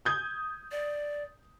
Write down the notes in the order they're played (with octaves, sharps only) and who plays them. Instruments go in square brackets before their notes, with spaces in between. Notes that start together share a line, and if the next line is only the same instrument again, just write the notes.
[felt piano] D#6 G6 G#6
[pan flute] D5